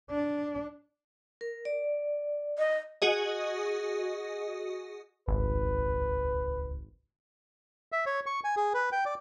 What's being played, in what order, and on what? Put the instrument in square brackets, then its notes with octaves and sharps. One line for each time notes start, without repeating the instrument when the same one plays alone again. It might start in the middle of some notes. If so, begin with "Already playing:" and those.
[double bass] D4
[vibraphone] A#4
D5
[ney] D#5
[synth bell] F#4 G#4 D#5
[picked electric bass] D#1 C#2 [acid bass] G#1 [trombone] B4
[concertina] E5
C#5
C#6
G#5
G#4
B4
G5
D5